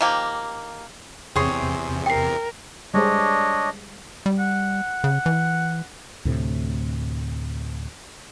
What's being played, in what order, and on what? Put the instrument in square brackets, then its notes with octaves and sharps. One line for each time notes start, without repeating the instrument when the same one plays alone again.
[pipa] D#3 F3 A#3 G4
[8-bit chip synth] E2 C3 [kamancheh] C4 [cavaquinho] G#4 C#5 C6
[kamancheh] A#4 [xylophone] G5 C7
[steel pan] G3 G#3 C5 [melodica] D4 C#5 D#5
[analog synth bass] G3
[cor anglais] F#5
[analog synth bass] C#3
E3
[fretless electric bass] D2 A2 C3